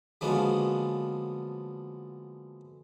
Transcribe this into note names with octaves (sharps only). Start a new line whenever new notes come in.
D3 F3 F#3 G#3 A#3 B3